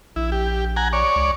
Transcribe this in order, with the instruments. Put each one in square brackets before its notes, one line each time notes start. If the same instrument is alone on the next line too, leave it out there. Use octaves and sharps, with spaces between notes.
[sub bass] A#1 [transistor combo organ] E4
[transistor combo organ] G4
F#5 G#5 A#5
C#5 D5
[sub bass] C#2